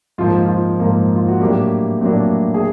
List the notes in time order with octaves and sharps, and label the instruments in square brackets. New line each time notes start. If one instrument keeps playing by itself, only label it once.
[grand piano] G#2 F3 A#3 F4
F4
G#2 F3 A#3
F4
F#4
A2 F#3 A#3 D4 G4
A2 F#3 A#3 D4
G#4